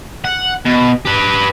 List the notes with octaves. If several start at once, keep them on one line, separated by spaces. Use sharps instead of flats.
F#5
B2
G4 B4